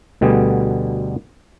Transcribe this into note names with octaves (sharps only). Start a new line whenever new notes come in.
D2 B2 D3 G3 B3 G#4